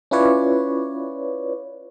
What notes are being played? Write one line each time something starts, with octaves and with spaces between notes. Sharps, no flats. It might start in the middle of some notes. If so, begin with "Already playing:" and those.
C#4 E4 F4 B4 C#5 D5